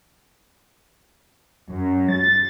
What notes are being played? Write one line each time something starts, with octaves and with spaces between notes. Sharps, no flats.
F#2
A6